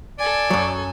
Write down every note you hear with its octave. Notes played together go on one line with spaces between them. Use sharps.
A4 D5 G#5
F#2 F#3